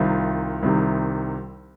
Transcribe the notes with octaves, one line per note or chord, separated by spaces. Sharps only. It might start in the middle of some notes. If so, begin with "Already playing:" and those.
Already playing: C2 C3 D#3 F4
C2 C3 D#3